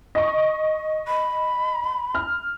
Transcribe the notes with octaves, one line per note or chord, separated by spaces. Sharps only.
D#5 C#6
B5
F6